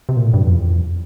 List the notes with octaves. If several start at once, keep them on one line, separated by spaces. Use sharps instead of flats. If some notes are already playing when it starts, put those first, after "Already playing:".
C3
A#2
A2
G2
F2
E2
F2